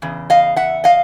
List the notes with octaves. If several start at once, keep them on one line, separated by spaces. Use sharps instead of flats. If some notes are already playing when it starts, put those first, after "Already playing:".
E2 C#3
D#5 F5
E5 F#5
D#5 F5